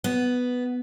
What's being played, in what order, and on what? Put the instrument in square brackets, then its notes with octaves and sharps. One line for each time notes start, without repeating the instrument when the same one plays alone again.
[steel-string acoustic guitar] B3